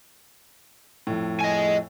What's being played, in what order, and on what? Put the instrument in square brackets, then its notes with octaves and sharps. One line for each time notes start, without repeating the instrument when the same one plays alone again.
[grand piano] F2 A2
[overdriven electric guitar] D#5 G#5